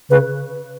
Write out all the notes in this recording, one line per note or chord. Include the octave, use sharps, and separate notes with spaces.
C#3 B4